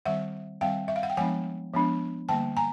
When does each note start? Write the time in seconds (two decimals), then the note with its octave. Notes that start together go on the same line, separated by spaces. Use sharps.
0.06 D#3 G3 C4 E5 F#5
0.61 D#3 G3 C4 F5 G5
0.88 E5
0.96 F5
1.03 F#5
1.10 G5
1.17 F3 G#3 B3 D4 F#5 G#5
1.73 F3 G#3 B3 D4
2.29 D3 G3 A#3 G5 A5
2.57 G#5 A#5